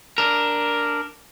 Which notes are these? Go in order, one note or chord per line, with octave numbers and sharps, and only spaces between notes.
D4 A#4